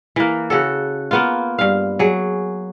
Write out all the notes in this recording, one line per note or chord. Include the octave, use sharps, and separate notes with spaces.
E3 A#3
C#3 F#4 A4
A#3 B3 F4
G2 F5
F#3 G#4